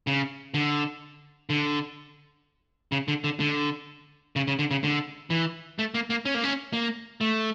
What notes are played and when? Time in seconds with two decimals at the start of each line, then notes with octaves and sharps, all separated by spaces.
0.07 C#3
0.54 D3
1.50 D3
2.92 C#3
3.08 D3
3.24 D3
3.40 D3
4.36 C#3
4.47 C#3
4.59 D3
4.71 C#3
4.84 D3
5.30 E3
5.79 A3
5.94 A#3
6.10 A#3
6.25 C#4
6.35 A#3
6.44 C#4
6.73 A#3
7.21 A3